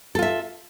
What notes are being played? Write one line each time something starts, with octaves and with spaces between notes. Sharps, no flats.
F4 A4 E5